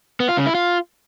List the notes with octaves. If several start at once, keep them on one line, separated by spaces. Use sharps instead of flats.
B3
F4
C#3
E4
F4